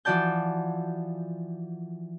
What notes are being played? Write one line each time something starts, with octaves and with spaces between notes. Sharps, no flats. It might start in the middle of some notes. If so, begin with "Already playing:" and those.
E3 F3 F#4 D5 A5 G6